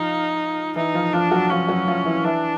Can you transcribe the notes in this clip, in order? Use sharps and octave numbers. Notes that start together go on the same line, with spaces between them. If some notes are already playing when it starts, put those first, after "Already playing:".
Already playing: F3 D#4 F4
E3 D#4 E4
F3 F4
F3 D4 F4
F#3 F#4
F3 C#4 F4
F#3 F#4
F3 F4
E3 E4
E3 D4 E4